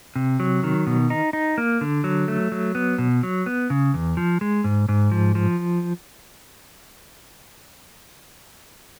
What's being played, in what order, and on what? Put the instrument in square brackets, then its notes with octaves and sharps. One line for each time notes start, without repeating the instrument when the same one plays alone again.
[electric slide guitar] C3
F#3
D#3
B2
D#4
D#4
A#3
D3
F#3
A3
F#3
B3
B2
F#3
B3
C#3
E2
F3
G#3
G#2
G#2
F3
F3